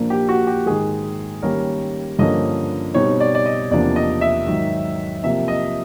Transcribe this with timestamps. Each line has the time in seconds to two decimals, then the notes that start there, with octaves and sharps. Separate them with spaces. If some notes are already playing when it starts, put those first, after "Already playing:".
Already playing: A#2 F3 A#3 D4
0.10 G4
0.29 F#4
0.47 G4
0.66 G#2 D#3 G#3 G#4
1.43 D#3 G3 A#3 C#4 A#4
2.19 G2 D3 F3 A#3 C#4 D#5
2.94 B2 G3 C4 D#4 C#5
3.20 D5
3.35 D5
3.46 D#5
3.71 E2 C3 F3 A#3 D4 D5
3.96 D#5
4.21 E5
4.46 G#2 D#3 F#3
5.24 C3 F3 A#3 E5
5.48 D#5